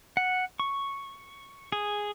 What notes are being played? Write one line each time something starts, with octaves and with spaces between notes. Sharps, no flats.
F#5
C#6
G#4